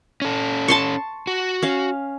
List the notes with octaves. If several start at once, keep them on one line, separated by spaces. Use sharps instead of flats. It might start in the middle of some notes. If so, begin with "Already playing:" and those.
C#4 A4
A5 C6 C#6
F#4
C#4 F5